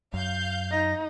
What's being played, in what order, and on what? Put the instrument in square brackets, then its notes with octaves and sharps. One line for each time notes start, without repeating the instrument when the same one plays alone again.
[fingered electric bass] F#2 [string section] F5 G6
[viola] D#4 [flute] A#6